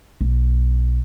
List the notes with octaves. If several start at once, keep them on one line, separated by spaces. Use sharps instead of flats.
B1